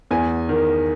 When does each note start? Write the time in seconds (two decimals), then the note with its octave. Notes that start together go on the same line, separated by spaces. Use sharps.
0.11 E2 G#5
0.49 D#3